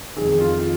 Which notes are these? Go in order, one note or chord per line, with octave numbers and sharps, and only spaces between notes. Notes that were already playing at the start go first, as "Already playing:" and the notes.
F2 D#3 G#4
F4